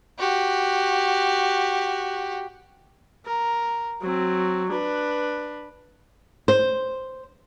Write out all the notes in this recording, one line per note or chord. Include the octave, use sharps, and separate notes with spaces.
F#4 G4
A#4
F#3 C4
D4 B4
C5